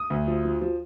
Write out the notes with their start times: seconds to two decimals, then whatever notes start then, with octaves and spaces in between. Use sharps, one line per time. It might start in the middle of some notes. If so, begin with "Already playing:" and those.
Already playing: D#6
0.10 D2
0.27 F3
0.45 F3
0.61 F3